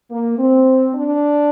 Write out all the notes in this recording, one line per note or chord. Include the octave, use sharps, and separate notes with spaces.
A#3
C4
D4